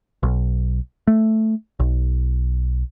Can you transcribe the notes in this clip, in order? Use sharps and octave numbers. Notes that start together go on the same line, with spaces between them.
B1
A3
B1